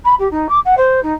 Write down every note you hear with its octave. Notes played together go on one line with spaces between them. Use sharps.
B5
G4
D#4
D6
F#5
C5
D#4